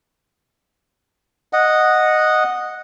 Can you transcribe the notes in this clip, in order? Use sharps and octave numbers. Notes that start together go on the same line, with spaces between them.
D#5 F#5